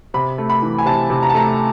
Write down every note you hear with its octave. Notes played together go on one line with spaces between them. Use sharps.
C3 B5
A3
B5
E3
G#5
C3 A5
C3
A#5
A5
A3 A#5